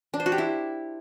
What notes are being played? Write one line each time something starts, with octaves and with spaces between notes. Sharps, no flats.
D4
C5
F#4
G4
E4